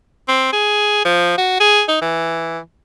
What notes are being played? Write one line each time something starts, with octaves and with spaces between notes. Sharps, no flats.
C4
G#4
F3
F#4
G#4
D#4
E3